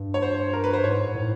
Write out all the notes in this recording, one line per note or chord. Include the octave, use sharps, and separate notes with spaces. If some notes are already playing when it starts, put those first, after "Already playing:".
Already playing: G2
C#5
C5
A#4
B4
C5
G#2 C#5
A2